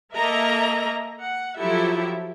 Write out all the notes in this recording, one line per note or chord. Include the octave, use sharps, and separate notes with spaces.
A#3 A4 A#4 D#5 E5 A#5
F#5
F3 F#3 E4 G4 A4 E5